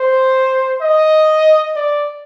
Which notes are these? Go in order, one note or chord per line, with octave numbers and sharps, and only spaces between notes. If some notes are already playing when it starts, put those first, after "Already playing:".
Already playing: C5
D#5
D5